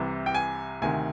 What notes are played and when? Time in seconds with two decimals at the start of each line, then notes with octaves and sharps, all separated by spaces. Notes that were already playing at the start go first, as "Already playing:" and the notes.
Already playing: C2 C3 E3
0.26 G5
0.34 G#5
0.82 D2 C3 D#3 G#5